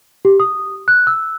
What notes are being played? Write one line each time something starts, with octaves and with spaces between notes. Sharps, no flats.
G4
D#6
F#6
E6